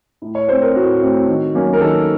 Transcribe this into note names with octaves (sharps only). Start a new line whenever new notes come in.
A2
C#5
A3 C4 C5
A#4
A2 F#4
A3 C4
D#3
F#3 A#3 C#4
A#4
D#3 A4